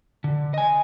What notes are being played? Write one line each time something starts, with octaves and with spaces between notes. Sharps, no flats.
D3
D#5 G#5